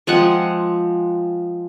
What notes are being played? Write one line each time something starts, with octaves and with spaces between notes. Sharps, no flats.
F3 G#3 C4 F#5